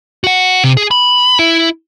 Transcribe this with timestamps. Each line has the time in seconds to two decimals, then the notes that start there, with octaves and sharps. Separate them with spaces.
0.24 F#4 F#5
0.64 C3
0.77 G#4
0.91 B5
1.39 E4